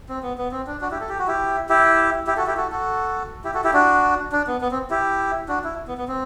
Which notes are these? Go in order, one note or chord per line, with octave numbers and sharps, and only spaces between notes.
C4
B3
B3
C4
D4
D4 F#4
E4 G4
A4
G4
F#4
E4 G4
E4 G4
E4 G4
F#4 A4
E4 G4
F#4 A4
F#4 A4
E4 G4
F#4 A4
E4 G4
D4 F#4
D4
B3
B3
C4
E4 G4
D4 F#4
E4
B3
B3
C4